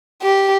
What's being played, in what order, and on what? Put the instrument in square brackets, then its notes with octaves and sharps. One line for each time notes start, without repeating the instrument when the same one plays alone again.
[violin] G4